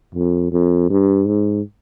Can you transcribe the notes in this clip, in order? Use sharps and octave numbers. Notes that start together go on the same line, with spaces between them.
F2
F2
G2
G#2